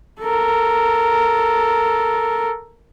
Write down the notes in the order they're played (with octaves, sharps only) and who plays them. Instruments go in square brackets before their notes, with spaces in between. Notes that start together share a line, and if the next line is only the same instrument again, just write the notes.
[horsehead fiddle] A4 A#4